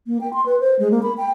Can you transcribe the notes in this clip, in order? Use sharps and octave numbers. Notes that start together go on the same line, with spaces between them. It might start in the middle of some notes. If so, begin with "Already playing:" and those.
A#3
G5
C6
B4
C5
G#3
A#3
B5
G5